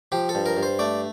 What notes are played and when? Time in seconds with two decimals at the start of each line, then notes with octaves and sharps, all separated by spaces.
0.12 F3 G4
0.29 A4
0.35 G2
0.46 A#4
0.57 G2
0.63 C5
0.79 A3 D5